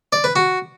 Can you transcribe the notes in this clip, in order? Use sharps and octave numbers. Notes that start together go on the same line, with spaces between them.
D5
B4
F#4